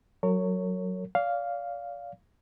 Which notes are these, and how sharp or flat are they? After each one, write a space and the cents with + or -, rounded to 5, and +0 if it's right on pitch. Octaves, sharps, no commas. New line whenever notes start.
F#3 +0 A#4 -35 C#5 +0
D5 -40 F5 +0